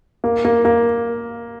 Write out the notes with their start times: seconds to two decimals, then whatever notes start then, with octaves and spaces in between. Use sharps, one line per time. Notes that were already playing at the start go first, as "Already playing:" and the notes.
0.24 A#3
0.45 A#3
0.65 A#3